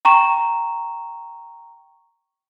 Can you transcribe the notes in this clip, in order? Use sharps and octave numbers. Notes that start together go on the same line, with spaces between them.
G5 A#5 C#6 E7